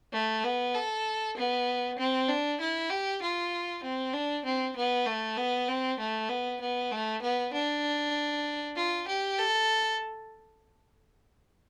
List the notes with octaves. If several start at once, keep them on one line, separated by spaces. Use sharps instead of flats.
A3
B3
A4
B3
C4
D4
E4
G4
F4
C4
D4
C4
B3
A3
B3
C4
A3
B3
B3
A3
B3
D4
F4
G4
A4